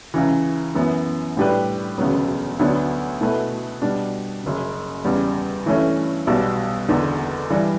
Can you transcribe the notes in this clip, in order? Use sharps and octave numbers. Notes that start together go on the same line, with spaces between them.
C#2 C#3 E3
F#2 E3 B3
A2 G3 D4 G4 B4
E1 D2 C#3 F#3 B3
D2 D3 F#3 B3 D4
B2 A3 E4 B4
B2 G3 D4
F#1 F#2 C#3
E2 C#3 G3
G2 E3 A3 C#4 E4
B1 B2 G3
F#1 E2 D3
G2 E3 G3 D4